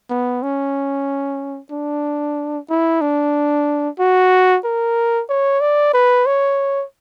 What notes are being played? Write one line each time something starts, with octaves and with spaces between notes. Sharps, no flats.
B3
C#4
D4
E4
D4
F#4
A#4
C#5
D5
B4
C#5